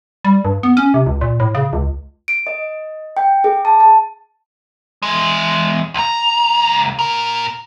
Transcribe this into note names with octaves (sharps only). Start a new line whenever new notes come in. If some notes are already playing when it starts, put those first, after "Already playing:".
G3
G2
B3
C#4
C3
C#2
A#2
A2
C#3
C#2
D7
D#5
G5
G#4
A5
A5
E3 G#3
C#2 A#5
A#2 A#4